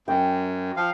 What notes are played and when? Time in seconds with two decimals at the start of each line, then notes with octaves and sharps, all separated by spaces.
0.08 F#2 G5
0.77 F3 F5